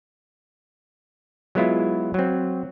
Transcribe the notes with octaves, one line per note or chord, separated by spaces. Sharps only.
F#3 G#3 B3 E4 F4
F#3 C4